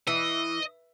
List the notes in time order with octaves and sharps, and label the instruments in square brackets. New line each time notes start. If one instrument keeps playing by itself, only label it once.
[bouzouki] E3 [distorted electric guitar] D#5